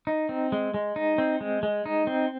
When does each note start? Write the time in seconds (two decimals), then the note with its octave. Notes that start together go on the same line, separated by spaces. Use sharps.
0.07 D#4
0.29 C4
0.52 G#3
0.74 G#3
0.96 D#4
1.18 C4
1.41 G#3
1.63 G#3
1.86 D#4
2.07 C4